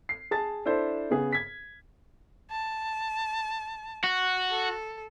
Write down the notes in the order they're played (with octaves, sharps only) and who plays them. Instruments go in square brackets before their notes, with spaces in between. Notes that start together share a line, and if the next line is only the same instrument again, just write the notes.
[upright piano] C7
G#4 A5 A6
D4 E4 A4 C5
C#3 B3 G#4
G#6 B6
[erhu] A5
[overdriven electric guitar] F#4
[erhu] A4